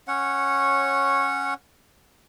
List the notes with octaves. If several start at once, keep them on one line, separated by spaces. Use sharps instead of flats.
C#4 C#5 F#5